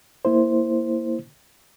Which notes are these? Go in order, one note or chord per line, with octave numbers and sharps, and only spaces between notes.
A#3 E4 C5